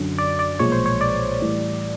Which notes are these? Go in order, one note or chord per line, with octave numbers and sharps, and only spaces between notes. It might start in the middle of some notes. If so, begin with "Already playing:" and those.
Already playing: F#2 D3 F#3
D5
D5
B1 A#2 F3 G#3 C#5
C5
C#5
D5
A2 E3 G3